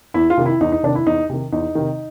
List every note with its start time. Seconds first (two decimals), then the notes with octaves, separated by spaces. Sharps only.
0.14 E2 E4
0.30 F4
0.37 C3 D#3
0.46 E4
0.61 E2 D#4
0.72 D#4
0.83 C3 D#3 D4
0.95 E4
1.06 E2 D#4
1.29 C3 D#3
1.52 E2 D#4
1.75 C3 D#3